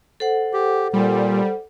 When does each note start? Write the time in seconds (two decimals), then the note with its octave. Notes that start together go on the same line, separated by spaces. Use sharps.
0.20 A4 C5 F#5
0.53 G4
0.93 A#2 G3